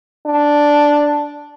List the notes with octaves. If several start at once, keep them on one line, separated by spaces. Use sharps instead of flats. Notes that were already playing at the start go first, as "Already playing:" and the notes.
D4